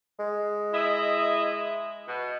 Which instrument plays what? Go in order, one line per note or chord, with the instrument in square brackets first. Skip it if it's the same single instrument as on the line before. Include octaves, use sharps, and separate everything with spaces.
[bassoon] G#3
[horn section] E4 D#5 E5
B2